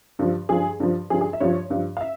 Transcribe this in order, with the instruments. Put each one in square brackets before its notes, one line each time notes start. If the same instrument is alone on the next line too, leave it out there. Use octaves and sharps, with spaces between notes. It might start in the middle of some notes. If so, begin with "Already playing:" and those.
[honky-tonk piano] G2 F3
G2 F3 G#4
G2 F3
G2 F3 G#4
G#4
E5
G2 F3 C#5
G2 F3
F5
E5